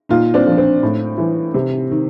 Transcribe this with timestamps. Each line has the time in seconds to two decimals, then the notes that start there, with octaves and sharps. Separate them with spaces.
0.09 A#2 D#4 F4
0.34 C4 D4
0.47 F3
0.58 C4
0.83 A2
1.18 E3
1.54 C3
1.91 D#3